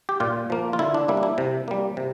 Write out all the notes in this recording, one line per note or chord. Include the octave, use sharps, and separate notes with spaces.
G4
A#2 F4
F3 A#3
F4
D3 E4
D4
G3 A#3 E4
D4
E4
C3
G3 A#3
C3